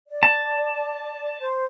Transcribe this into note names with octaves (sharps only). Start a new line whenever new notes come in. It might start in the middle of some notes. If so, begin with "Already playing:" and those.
D5
A5
C5